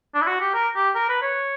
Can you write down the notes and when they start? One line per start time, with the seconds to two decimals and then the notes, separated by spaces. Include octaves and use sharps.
0.15 D4
0.22 E4
0.27 F#4
0.41 G4
0.55 A#4
0.76 G4
0.95 A#4
1.09 B4
1.23 C#5